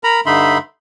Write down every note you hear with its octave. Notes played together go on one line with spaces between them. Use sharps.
A#4 A#5 B5
G2 D3 D#4 E5 B5 C6